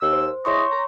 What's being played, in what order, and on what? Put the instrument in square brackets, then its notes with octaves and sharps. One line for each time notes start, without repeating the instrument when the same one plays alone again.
[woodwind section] D#2 E6
[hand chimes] C5
[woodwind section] E4 G#4 D#5 [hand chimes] C#5 C6 C#6
[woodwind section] A#5